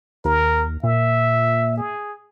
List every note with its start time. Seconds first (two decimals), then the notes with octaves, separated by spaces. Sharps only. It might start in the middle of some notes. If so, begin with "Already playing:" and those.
0.25 D#2 A#4
0.84 A#2 E5
1.77 G#4